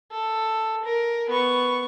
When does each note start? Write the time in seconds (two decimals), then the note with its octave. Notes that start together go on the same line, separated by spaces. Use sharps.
0.12 A4
0.85 A#4
1.30 B3 C#6